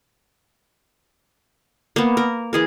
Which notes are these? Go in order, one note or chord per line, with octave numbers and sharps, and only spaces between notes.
A#3 B3
A#4
E3 G#4 A#4